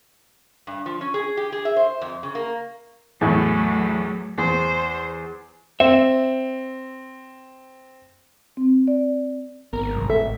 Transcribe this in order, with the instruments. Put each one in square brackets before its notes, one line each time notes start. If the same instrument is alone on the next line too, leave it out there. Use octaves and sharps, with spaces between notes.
[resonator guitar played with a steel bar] G2
F3
C#4
G#4
G4
G#4
E5
C5
F2
C#3
A#3
[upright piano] E2 A2 [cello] F#3 A3
[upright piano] E2 [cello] C5
[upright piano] C4 [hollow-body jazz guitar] E5
[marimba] C4
D5
[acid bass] G#1 [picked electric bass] B3 [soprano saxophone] A#4
[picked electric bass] C2 G#2 F#3
[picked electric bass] A2 D#3 [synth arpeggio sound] A4 [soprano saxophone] E5